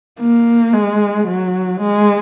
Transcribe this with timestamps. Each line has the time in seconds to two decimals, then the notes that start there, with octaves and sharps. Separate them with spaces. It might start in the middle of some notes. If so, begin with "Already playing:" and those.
0.20 A#3
0.73 G#3
1.27 F#3
1.81 G#3